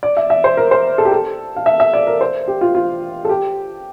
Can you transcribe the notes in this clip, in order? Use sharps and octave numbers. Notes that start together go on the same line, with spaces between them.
D5
E5
E5
C5
A#4
C5
A4
G4
A4
F5
E5
E5
D5
A#4
C5
G4
F4
F4
A4
G4